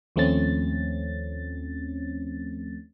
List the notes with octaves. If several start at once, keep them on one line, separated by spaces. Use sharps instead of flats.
D#2 F3 A3 C4 C#4 A6